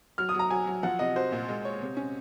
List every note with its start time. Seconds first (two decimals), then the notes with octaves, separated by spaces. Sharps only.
0.18 F#3 F6
0.29 D#6
0.34 F#3 A#5
0.50 F#3 G#5
0.67 F#3
0.83 F3 F#5
0.99 C3 D#5
1.16 F#4 C5
1.32 A#2
1.49 G#3
1.65 C#5
1.81 C3
1.97 C#4